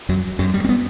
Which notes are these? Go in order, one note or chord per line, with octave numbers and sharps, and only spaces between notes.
F#2 F#3
F#2 F#3
G3
C4
B3